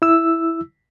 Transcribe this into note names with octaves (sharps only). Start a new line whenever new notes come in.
E4 E6